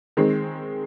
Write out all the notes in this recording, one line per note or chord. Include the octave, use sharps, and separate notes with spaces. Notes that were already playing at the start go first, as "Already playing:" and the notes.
D#3 G#3 C4